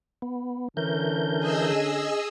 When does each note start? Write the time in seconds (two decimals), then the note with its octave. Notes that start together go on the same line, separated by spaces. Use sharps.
0.22 B3
0.77 D3 E3 C#4 D4 A#4 G6
1.39 G#4 D#5 E6